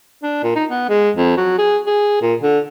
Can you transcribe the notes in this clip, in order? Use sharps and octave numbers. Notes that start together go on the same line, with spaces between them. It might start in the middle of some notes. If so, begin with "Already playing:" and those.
D4
A#2
D#4
B3
G#3
F2
F#3
G#4
G#4
A#2
D3